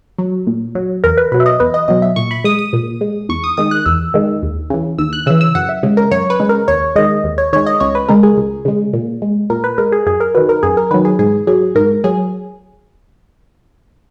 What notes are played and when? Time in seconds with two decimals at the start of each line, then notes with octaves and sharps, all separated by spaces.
0.19 F#3
0.47 A#2
0.75 F#3
1.04 E2 A#4
1.17 B4
1.32 B2 F#3 B4
1.40 E5
1.46 D#5
1.60 E2 B4
1.74 D#5
1.88 B2 F#3 D#5
2.02 E5
2.16 A#2 C#6
2.31 B5
2.44 G#3 D#6
2.59 D#6
2.73 A#2
3.01 G#3
3.29 E2 C#6
3.44 D#6
3.57 D#3 G#3 D#6
3.71 F#6
3.86 E2 E6
4.14 D#3 G#3
4.42 D#2
4.70 C#3 E3
4.99 D#2 E6
5.13 F#6
5.26 C#3 E3 E6
5.41 E6
5.55 F#2 F#5
5.69 E5
5.83 C#3 G#3
5.97 A#4
6.11 F#2 C#5
6.30 B4
6.40 C#3 G#3
6.49 A#4
6.68 D#2 C#5
6.96 D#3 G#3 D#5
7.24 D#2
7.38 C#5
7.53 D#3 G#3 C#5
7.67 D#5
7.80 C#2 C#5
7.95 B4
8.09 C#3 G#3 A#4
8.23 G#4
8.37 C#2
8.65 C#3 G#3
8.93 A#2
9.22 G#3
9.50 A#2 A#4
9.64 B4
9.78 G#3 A#4
9.92 G#4
10.06 F#2 G#4
10.20 A#4
10.35 D#3 F#3 B4
10.49 A#4
10.63 F#2 G#4
10.77 A#4
10.91 D#3 F#3 B4
11.05 G#4
11.19 G#2 G#4
11.47 F#3 G#4
11.75 G#2 A#4
12.04 F#3 G#4